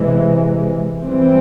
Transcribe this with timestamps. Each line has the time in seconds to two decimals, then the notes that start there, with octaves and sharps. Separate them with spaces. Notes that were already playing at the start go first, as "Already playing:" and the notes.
Already playing: C3 E3 G#3
1.03 E3 G3 C4